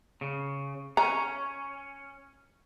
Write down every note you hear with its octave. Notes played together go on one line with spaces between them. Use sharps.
C#3
C#4 A#5